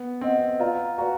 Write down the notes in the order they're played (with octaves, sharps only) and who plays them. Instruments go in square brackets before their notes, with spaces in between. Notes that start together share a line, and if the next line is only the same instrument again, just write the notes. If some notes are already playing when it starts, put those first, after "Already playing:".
Already playing: [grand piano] B3
[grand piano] C4 [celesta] B4 D#5 F#5
[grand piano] F4 [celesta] B4 D5 F5 A#5
[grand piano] F#4 [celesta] B4 D5 F5 A#5